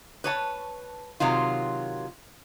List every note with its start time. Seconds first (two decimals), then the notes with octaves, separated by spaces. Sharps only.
0.24 B4 C#5 A5
1.20 C3 D#3 F#3 F4